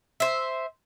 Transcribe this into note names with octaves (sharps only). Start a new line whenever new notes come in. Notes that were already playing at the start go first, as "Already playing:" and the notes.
C5 E5